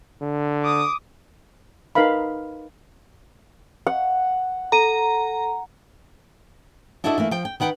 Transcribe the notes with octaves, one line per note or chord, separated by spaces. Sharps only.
D3
D6 D#6
D#4 A#4 B4 F5 B5
F#5
A4 A#5 D#7
D4 E4 F#4 A4 D#5 E5
E3 A3 A#3
F3 G5
G5
D#3 B4 F#5 G5